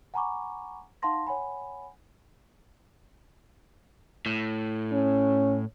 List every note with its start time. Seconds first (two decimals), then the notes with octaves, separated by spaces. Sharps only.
0.14 F#5 G#5 A#5 B5 C#6 D6
1.02 D#4 F5 F#5 A5 C6 A#6
1.27 C#5 F#5 G#5 B5
4.26 A2
4.92 C#4